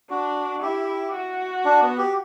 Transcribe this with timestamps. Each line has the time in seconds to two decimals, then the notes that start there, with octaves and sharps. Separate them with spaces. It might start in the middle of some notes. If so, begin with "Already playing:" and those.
0.10 D4 F#4
0.62 E4 G4
1.13 F#4
1.65 D4
1.82 B3
1.98 G4